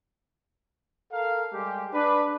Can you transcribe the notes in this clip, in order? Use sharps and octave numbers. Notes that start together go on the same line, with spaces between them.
A4 A#4 F5
G3 G#3 G4
D4 B4